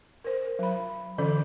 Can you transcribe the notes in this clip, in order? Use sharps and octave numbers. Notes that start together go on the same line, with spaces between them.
A#4 C5
F#3 B5
D3 E3 C#4 A4 D5